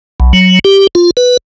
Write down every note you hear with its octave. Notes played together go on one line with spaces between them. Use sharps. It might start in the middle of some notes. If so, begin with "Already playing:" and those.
B1
F#3
G4
F4
B4